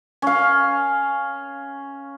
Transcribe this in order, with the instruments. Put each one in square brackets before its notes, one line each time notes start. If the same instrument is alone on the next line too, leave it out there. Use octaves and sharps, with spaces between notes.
[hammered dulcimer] C#4 F5